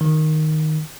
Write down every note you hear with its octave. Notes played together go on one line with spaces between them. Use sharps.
D#3